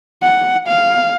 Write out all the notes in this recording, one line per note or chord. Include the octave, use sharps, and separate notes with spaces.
F#5
F5